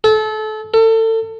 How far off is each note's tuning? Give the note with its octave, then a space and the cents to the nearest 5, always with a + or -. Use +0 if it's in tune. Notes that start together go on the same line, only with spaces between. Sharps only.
A4 -30
A4 +30